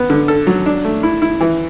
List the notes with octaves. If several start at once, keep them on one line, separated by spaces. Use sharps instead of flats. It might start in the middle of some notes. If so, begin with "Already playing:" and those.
Already playing: B3
D3
A4
F#3
D4
A3
E4
E4
E3